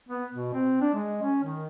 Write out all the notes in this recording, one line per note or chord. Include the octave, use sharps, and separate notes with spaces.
B3
B2
C4
D4
G#3
C#4
D#3